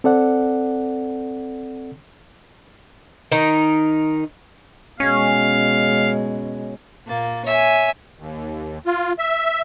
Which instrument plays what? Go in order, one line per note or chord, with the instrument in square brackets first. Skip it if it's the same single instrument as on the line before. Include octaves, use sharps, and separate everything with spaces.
[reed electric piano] C4 A4 D5 F#5
[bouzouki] D#3 D#4
[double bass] B2 G#3 [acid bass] C#4 [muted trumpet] F5
[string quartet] A#2 A#3 A6
[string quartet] C#5 G#5 [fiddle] E5
[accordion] D#2
F4
E5